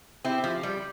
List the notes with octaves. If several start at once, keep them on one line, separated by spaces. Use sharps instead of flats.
C4 E4 G4
F3
G3